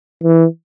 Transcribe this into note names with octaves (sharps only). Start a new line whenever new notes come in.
E3